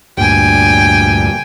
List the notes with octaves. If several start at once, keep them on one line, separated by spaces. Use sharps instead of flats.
D2 G2 A#2 G5 G#5